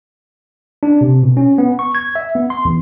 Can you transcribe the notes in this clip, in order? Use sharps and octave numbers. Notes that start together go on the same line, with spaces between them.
D4
C3
B2
C#4
B3
C#6
G#6
E5
B3
C6
E2